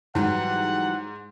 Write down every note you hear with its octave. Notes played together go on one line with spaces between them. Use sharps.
G#2 E3 F#3 G3 F#5